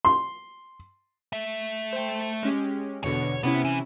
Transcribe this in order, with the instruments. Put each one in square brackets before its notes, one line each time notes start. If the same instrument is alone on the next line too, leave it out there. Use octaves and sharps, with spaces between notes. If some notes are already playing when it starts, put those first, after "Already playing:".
[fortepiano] C6
[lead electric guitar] A3 E5
[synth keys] C5 G5
G#3 C#4 G4
[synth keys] E2 B2 D3 [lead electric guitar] C#5
[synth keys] C3 C#4 E4 [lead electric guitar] B3
[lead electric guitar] E3